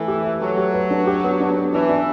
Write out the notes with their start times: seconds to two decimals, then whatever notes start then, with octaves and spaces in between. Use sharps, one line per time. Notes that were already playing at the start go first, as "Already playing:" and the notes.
Already playing: E3 A3 B4
0.08 G4
0.25 B4
0.41 F#3 A3
0.58 G4
0.74 B4
0.91 D4
1.07 G4
1.24 B3
1.40 D4
1.57 B3
1.73 E3 D4
1.89 D4